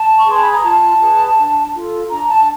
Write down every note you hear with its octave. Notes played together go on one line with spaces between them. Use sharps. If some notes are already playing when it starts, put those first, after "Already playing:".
Already playing: A5
C#6
G#4 B4 C6
B5
A#5
F4 A5
G#4 B4
D4
F4 A4
D4 A#5
A5